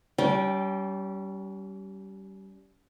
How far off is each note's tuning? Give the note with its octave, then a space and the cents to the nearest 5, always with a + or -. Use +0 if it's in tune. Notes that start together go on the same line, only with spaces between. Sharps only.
G3 -20 C#4 +30 G5 +0